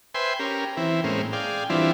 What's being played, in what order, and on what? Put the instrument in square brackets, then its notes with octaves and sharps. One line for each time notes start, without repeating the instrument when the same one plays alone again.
[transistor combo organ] B4 C5 E5 G5 G#5 C6
C#4 G4 A#4
E3 C4 E4
A2 G#3 A#3 C4 C#4
G#4 D5 F5 G5
E3 G3 C4 D4 E4 F4